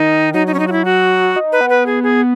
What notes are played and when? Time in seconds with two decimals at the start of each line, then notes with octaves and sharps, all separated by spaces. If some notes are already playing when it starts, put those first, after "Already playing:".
Already playing: D#3 D#4
0.34 F#3 D#4
0.47 D#4
0.54 C#4
0.59 D#4
0.67 F#4
0.72 E4
0.85 F#4
1.36 D#4
1.52 B4
1.61 B3
1.70 B4
1.86 G#4
2.03 G#4